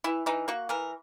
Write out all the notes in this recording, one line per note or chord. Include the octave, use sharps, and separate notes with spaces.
E3 E4
E3 D#4
A#3 F#4
E3 A#4